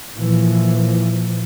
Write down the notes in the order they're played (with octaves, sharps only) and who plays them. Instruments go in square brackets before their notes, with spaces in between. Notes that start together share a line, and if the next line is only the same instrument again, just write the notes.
[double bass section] A#2 E3 F3